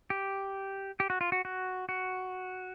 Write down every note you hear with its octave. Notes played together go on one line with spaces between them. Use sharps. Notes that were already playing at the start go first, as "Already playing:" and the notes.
G4
G4
F#4
F4
F#4
F#4
F#4